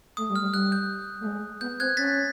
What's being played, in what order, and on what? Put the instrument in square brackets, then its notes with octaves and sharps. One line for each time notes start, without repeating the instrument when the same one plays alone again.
[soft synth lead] A3 [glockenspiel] D#6
[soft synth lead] G3
[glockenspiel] F6
[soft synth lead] G3
[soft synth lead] G3 [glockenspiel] F#6
[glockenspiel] G6
[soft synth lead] A3
G#3
[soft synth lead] B3 [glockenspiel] G6
[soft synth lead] C4 [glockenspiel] F#6 G#6
[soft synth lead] C#4 [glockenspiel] A6 B6